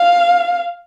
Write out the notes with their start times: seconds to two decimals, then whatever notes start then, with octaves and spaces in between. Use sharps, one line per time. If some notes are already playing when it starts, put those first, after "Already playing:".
Already playing: F5